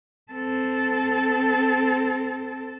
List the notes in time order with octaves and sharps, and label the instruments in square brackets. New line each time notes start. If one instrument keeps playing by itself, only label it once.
[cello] C4 A4